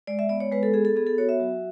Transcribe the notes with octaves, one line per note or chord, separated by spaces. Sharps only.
G#3 D5
E5
B3 D5
C#5
G#3 B4
A4
B3 G#4
A4
B3 G#4
A4
F#4 C#5
E5
F#3